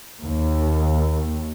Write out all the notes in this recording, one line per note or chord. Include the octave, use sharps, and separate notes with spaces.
D#2